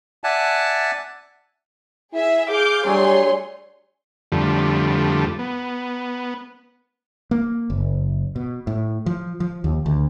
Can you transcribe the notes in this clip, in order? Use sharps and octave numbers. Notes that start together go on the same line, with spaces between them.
D5 E5 F#5 G#5 A5
E4 G#4 E5
G#4 F5 D6 G6
F#3 G3 A3 D4 G#4 C#5 C6
F2 D3 F3 G3 A3
B3
A#3
F#1
B2
A2
F3
F3
D#2
D2